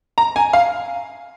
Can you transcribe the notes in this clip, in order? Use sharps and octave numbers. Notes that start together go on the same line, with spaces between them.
A#5
G#5
F5